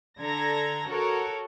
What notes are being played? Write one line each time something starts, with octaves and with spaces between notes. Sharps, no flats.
D3 A4 A#5 G#6 A#6
F#4 A4 A#4 C#5